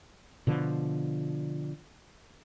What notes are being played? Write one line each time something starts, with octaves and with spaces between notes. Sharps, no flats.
B2 D3 F3